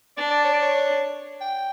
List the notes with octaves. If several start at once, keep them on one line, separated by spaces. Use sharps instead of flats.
D4 D5
D5
C#5
D5
C#5
G5